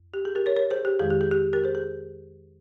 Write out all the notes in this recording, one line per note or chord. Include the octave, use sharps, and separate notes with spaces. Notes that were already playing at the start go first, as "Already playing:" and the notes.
Already playing: F2
G4
G#4
G4 A#4
A#4 C#5
A#4 C#5
G#4 C5
G4
F2 D#3 G#3 G#4
G4
G#4
G4
G4 A#4
G#4 C5
G#4